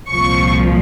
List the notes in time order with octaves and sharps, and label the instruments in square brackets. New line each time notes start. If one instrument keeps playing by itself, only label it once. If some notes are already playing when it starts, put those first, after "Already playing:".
[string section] C2 A#2 F3 C#6